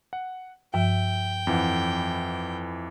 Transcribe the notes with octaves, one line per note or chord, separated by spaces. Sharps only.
F#5
G2 F3 E5 G5
F2 E3 F#5